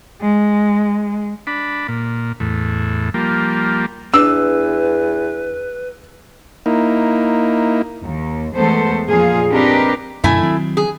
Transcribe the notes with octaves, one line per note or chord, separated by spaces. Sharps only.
G#3
D4 B5
A#2
E2 A2
F3 G3 A#3
E2 D4 B4 E6
A#3 D#4 E4
D#2
E2 G#3 A3 B3 A4 C5
F2 A#2 F3 F4 G#4 F5
C4 D4 D#4 G4 A#4 B4
F#2 B2 D3 A3 E4 G#5
D#3 F#3 C4
G#4